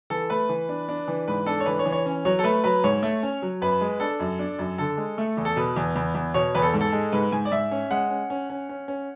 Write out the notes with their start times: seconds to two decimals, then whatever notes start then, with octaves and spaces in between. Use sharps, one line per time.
0.10 E3 A4
0.30 A3 B4
0.49 E3
0.69 D4
0.89 D4
1.08 E3
1.28 G#2 B4
1.46 D4 A4
1.60 C#5
1.66 E3 B4
1.79 C#5
1.86 E3
1.92 C#5
2.06 C#4
2.25 F#3 C#5
2.39 A4
2.44 A3 B4
2.64 F#3 B4
2.84 G#2 C#5
3.03 A3
3.23 C#4
3.42 F#3
3.62 F#2 B4
3.81 G#3
4.00 D4 A4
4.20 F#2
4.39 D4
4.59 F#2
4.78 D3 A4
4.97 G#3
5.18 A3
5.37 E2
5.45 A4
5.56 B2 B4
5.76 E2
5.95 E2
6.15 E2
6.34 B2 C#5
6.55 E2 B4
6.62 A4
6.74 G#2
6.81 A4
6.93 G#3
7.12 G#2 B4
7.32 G#2 G#5
7.45 D5
7.52 G#2 E5
7.71 C#4
7.90 G#3 F#5
8.10 C#4
8.30 C#4
8.50 C#4
8.69 C#4
8.88 C#4